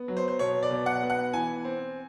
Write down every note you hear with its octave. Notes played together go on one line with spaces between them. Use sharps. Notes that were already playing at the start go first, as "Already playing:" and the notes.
Already playing: B3
F#3
C5
C5
B2 C#5
D5
B2
F#5
B3
F#5
E3 G#5
C4